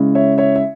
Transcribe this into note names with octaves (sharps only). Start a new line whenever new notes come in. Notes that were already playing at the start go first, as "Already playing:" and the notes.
Already playing: C#3 G#3 C#4 E4
C#5 E5
C#5 E5
E5